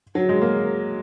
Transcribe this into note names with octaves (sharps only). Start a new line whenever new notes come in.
F#3
G#3
A#3